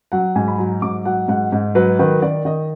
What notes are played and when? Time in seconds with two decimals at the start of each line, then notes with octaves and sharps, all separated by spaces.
0.12 F#3 F#5
0.36 G#2 G#5
0.48 B5
0.58 F#3 A#5
0.82 G#2 D6
1.05 F#3 F#5
1.28 G#2 F#5
1.52 G#2
1.75 F#3 B4
1.99 D#3 B4
2.22 D#3 D5
2.45 D#3 D#5